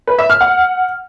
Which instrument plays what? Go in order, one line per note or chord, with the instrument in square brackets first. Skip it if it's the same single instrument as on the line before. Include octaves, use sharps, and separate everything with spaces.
[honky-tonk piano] B4
E5
F6
F#5